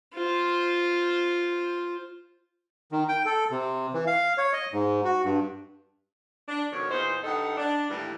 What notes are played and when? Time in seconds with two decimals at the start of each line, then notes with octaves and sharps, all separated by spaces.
0.14 F4 C5
2.92 D#3
3.09 G5
3.25 A4
3.51 C3
3.94 E3
4.07 F5
4.38 C#5
4.53 D#5
4.73 G#2
5.04 F#4
5.24 G2
6.48 D4
6.72 F2 B2 D#3 C#5
6.90 E2 A#2 D#4 C5
7.24 G2 D#3 D#4 A4 D#5 F#5
7.57 D4
7.89 D#2 A2 E3 G3